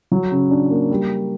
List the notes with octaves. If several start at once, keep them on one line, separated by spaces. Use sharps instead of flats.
F#3
C#3
D4
A#3
G3